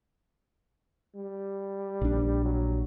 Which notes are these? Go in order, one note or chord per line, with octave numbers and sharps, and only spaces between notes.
G3
A#1 D4
F#3